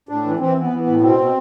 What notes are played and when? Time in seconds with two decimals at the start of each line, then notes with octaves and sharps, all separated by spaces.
0.09 A2 D4
0.24 E3
0.39 E3 C4
0.55 E3
0.60 B3
0.70 E3
0.81 B3
0.87 A2
1.01 B2 C4
1.17 B2